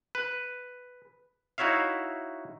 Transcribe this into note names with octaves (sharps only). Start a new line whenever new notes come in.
B4
D#4 E4 F#4 C#5 E5 F5